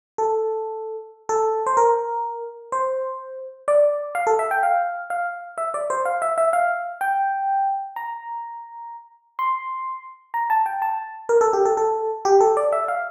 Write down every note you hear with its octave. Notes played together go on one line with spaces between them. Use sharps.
A4
A4
C5
A#4
C5
D5
F5
A4
E5
G5
F5
F5
E5
D5
C5
F5
E5
E5
F5
G5
A#5
C6
A#5
A5
G5
A5
A#4
A4
G4
A4
A4
G4
A4
D5
E5
F5